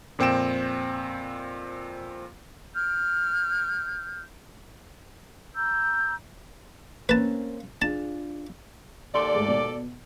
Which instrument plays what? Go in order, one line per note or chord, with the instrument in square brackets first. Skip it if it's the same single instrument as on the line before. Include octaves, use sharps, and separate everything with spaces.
[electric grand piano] F2 A#2 C4 G5 D7 E7
[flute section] F6 G6
A#5 E6 G6
[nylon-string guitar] A#3 C4 C#4 [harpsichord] B4 A5
[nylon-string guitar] D4 F4 G#4 [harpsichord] A5
[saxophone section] D#2 A4 D5 [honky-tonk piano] C6
[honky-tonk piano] G#2 G#3 A3
B2